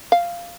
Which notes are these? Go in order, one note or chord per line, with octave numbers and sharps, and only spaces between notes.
F5